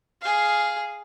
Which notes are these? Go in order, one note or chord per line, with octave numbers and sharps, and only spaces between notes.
G#4 F5